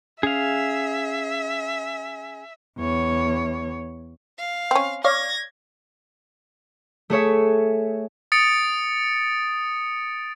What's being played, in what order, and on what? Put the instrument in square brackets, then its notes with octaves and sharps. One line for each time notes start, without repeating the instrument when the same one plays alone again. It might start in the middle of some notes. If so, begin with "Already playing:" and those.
[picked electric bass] C#4 [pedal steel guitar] G#4 F5 [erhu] E5
[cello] E2 C#5
[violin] F5
[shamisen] C4 C#4
[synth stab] C#5 D5 F5 [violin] G#6 A#6
[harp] A3 G#4 C#5 E5
[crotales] D#6 A6 C#7 D7